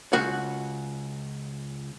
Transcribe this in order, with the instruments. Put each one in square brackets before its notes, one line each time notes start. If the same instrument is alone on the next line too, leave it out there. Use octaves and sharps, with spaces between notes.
[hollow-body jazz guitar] C#2 F#4 F#5